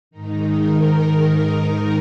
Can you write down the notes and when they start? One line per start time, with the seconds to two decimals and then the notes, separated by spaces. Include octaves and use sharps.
0.11 G#2 D#3 D#4
0.54 A#4
0.99 A#4